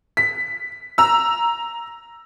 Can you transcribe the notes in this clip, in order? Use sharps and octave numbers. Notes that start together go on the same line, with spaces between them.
B6
A#5 E6